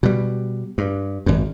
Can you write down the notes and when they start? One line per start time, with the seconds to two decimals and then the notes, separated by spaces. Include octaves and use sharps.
0.03 B2 G3
0.78 G2
1.26 G#1 F#2